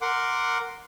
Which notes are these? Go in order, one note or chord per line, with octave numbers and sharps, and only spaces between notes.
A#4 F#5 C6 D6